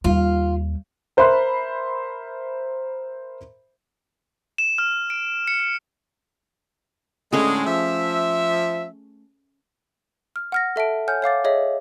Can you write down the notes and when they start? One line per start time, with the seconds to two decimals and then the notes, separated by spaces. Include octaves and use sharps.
0.04 D#2 G3 F4
1.17 A#4 C5 E5 B5 C6 F#6
4.58 E7
4.78 F6
5.10 D7
5.48 C#7
7.32 A2 D3 G#3 A3 C#4 G#4
7.67 F3 E5
10.36 F6
10.52 F#5 F6 A#6
10.76 A4 E5 A5 D7
11.08 C#5 F#5 G#5 F6 G6
11.22 C#5 F5 D6 A6
11.44 G#4 C#5 D#5 E5